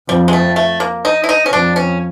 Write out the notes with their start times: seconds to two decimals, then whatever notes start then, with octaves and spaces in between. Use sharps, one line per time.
0.08 F2 G3
0.28 G#3
0.33 A3
0.56 A3
0.80 A#3
1.05 D#4
1.24 E4
1.29 D#4
1.46 C#4
1.52 F2 D4
1.76 C#4